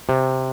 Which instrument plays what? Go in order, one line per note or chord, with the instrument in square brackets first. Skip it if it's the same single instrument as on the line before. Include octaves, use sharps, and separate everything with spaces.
[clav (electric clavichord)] C3